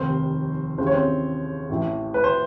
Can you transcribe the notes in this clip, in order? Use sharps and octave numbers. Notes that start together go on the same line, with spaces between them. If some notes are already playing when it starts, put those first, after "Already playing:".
Already playing: F1 D#2 D#3 C4 C5
D#2 C#3 E3 C5
C#5
C4 C5
A1 A2 E3
B4
C5